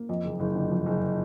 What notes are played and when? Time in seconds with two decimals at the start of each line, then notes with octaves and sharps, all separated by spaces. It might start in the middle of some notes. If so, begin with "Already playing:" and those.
Already playing: A#3
0.09 F2 D#5
0.25 F#1
0.40 F#1
0.55 D3
0.71 F2
0.86 F#1